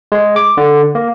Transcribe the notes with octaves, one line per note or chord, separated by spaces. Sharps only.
G#3
D6
D3
A#3